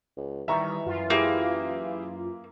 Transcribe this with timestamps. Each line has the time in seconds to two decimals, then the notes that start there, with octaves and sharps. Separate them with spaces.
0.17 C#2
0.48 D#3 E3 G3 E5 A#5 C#6
0.86 F#2 F4
1.10 A#3 E4 G4 G#4